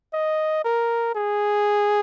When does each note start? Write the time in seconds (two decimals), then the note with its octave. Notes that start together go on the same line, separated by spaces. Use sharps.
0.13 D#5
0.64 A#4
1.15 G#4